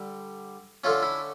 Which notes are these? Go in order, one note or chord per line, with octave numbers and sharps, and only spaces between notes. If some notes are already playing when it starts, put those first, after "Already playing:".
Already playing: D3 G3
D3 A3 C#4 F4
E4